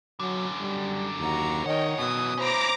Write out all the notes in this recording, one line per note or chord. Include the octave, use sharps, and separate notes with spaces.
F#2 D3 F#3
G3
D#2 F#4 A#5
D#3 C#5 D#5 F#5 G5
F#2 B2 E3 D#6
C#4 E4 C5 A#5 D6